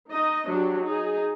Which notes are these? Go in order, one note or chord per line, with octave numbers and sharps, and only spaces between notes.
D#4 D#5
F#3 D4 F#4 G4
D#4 G#4